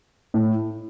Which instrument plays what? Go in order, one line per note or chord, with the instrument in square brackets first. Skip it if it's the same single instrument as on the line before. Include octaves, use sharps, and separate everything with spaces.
[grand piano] A2